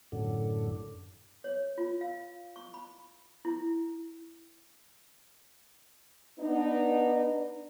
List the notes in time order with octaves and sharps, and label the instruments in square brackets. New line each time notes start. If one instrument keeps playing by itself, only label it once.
[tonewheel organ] F#2 A2 D3
[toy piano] C#5
F4
F5
C#6
B5
E4
[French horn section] B3 D4 D#4